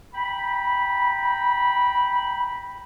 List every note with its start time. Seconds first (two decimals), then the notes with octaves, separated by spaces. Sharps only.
0.13 G5 A#5 B5